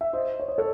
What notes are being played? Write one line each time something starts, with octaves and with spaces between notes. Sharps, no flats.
E5
C5 D#5
C#5
D#5
A4 C#5